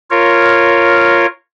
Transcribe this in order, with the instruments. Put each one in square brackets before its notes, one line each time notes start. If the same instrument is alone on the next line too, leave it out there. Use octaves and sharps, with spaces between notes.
[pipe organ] F4 A#4 C#5